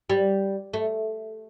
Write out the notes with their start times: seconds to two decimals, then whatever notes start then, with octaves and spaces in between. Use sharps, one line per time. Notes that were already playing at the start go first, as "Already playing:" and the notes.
0.10 G3
0.74 A3